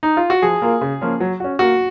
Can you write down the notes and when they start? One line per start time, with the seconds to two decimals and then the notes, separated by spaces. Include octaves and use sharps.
0.03 D#4
0.17 F4
0.30 F#4
0.42 F3 G#4
0.62 A#3 F4 A#4
0.81 C#3
1.01 F3 A#3 C#4 F4
1.20 F#3
1.40 C#4 F#4
1.59 A#3 F#4